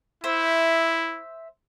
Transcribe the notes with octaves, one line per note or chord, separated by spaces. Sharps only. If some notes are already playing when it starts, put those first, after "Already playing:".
E4 C5 E5